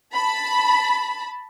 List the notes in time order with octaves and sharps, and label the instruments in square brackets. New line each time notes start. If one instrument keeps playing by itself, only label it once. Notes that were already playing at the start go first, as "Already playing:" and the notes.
[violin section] A5 B5